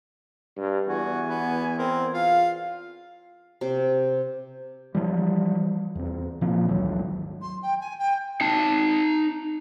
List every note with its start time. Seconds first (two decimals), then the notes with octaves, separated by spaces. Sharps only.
0.56 G2
0.88 E2 F#4 G#5
1.27 B3
1.78 C4 A#4
2.13 F4 F5
3.61 C3
4.95 E3 F3 G3
5.95 E2 C4
6.41 A#2 E3 F3 C4
6.69 G#1 D2 D#3 F#3
7.42 C6
7.63 G5
7.81 G#5
7.99 G5
8.41 D#4 A5